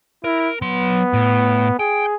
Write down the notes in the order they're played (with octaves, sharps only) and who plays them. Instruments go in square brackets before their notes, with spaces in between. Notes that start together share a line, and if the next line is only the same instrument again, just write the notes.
[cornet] E4 [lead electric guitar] A#4
[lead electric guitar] F#3 C6 [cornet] B3
[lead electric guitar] A2
[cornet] G#4 [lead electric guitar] G5